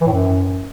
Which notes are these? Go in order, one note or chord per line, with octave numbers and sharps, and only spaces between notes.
E3
A2
F#2